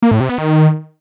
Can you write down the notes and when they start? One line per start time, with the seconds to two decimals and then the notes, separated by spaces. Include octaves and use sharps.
0.02 A#3
0.11 A2
0.20 C3
0.29 B3
0.38 D#3